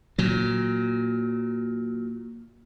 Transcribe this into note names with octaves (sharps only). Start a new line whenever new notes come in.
A#2 F#3